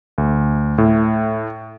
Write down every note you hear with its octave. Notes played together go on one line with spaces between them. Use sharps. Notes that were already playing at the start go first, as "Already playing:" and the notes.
D2
A2